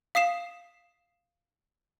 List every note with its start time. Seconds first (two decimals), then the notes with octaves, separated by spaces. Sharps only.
0.15 F5 D#6 C7 E7